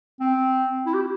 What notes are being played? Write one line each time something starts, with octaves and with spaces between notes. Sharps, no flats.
C4
E4
G4